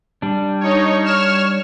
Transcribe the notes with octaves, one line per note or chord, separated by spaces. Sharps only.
G3 D4
D#4 C#5
C#5 F6 E7